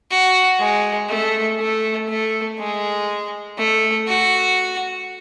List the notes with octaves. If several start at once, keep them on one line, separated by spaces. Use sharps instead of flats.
F#4
G#3
A3
A3
A3
G#3
A3
F#4